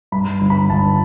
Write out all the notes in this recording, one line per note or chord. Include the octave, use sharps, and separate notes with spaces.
G2 B5
G1
B5
G1 A5